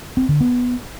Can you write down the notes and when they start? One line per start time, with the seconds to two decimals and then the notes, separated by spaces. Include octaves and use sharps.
0.17 C4
0.29 D3
0.41 B3